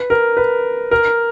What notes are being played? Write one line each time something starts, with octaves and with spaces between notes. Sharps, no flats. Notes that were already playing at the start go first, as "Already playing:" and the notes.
Already playing: B4
A#4
B4
A#4